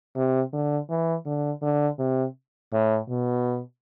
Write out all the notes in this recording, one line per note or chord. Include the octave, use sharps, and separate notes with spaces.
C3
D3
E3
D3
D3
C3
A2
B2